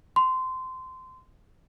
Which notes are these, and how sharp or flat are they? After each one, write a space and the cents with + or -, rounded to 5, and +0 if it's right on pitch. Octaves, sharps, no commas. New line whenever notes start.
C6 -20